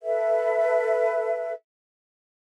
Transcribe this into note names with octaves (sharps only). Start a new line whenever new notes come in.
A4 B4 E5